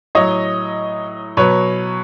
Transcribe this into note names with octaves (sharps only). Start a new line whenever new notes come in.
A2 F#3 C#5 D#5
B2 F#3 B4 C#5